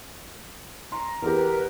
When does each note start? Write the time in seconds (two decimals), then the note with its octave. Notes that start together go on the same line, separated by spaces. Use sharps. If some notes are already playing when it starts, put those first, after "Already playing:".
0.92 A#5 C6
1.22 E2 G4 A#4
1.35 B4